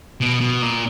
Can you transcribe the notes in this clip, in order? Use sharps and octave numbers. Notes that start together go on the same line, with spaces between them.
B2
B2
A#2